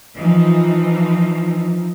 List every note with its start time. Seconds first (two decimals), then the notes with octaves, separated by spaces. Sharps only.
0.16 E3 F3 D#4